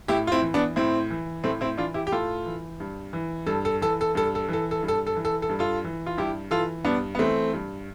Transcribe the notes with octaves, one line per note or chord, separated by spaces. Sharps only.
A2 E4 G4
F4
C4 E4
E3
B3 D4
A2 C4 E4
E3
A2 A3 C4
C4 E4
E3 D4 F4
E4 G4
G4
A2 F4 A4
E3
G2
E3
G2 A4
A4
E3 A4
A4
G2 A4
A4
E3 A4
A4
G2
A4
A4
E3
A4
A4
G2
F4 A4
E3
F4
G2 E4 G4
E3 F4 A4
G2 B3 D4
B3
E3 A3 C4
G2